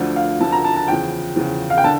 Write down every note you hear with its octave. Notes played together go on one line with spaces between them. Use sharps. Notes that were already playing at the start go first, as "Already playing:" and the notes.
Already playing: D2 D3 F3
F5
D2 D3 F3 A5
A#5
A5
A5
E2 C#3 F3 G5
E2 C#3 F3
F5
G5
D3 A5